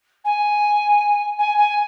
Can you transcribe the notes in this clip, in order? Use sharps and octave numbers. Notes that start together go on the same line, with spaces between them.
G#5
G#5
G#5